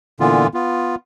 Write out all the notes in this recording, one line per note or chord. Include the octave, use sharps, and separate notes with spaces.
A#2 D3 E3 B3 F4
B3 F4